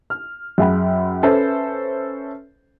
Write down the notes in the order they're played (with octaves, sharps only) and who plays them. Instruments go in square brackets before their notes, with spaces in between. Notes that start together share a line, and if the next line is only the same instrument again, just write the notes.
[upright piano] F6
F#2 G#4 F#5 G5 B5
C#4 A4 B4 C5 E5